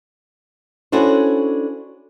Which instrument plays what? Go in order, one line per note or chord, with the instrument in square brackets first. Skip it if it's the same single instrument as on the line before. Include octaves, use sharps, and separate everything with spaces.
[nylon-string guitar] C#4 D4 E4 F#4 A4 C5